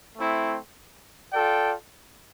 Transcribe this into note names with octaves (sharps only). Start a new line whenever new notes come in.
A3 C4 E4
F4 A4 D5 G5